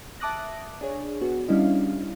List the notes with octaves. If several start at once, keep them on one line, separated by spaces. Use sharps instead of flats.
E5 A5 D6 D#6 F#6 A#6
D4 G#4 C#5
B3 F#4
G3 C#4 D4 E4 D#5 F5